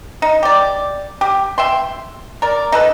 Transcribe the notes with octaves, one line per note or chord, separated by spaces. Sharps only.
D#4
G4 D5
G4
E5 G5 C6
A#4 D5
D#4 A4 B4